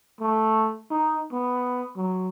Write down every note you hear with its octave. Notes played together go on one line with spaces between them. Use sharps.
A3
D#4
B3
F#3